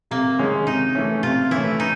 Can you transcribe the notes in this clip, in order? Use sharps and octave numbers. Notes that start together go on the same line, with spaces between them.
C3 A#3
D#3 G#3 C#4
C3 D#4
E3 A3 C#4
C3 F4
E3 A3 C#4 E4
D#4